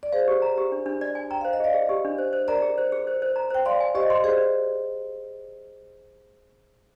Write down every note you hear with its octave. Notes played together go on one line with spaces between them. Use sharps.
D5
G#4 C5 F5
G4
A#5
G4
D4
D4
D5
G#5
G5 A#5
C5 F5
D#5
G#4 D5 F5
G#4
G4
D4
C5
C5
A#4 D5 A#5
G#4
C5
G#4
C5
C5
A#5
C5 G5
D5 F5 C6
G#5
G4 C5 D#5
C6
G#4 C5 D5